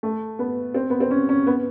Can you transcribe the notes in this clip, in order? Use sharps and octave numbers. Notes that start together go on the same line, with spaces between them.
A3
B3
C4
B3
C4
C#4
C#4
B3